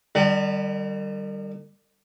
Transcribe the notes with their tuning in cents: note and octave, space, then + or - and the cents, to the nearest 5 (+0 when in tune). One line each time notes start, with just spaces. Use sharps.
D#3 -45 G3 +0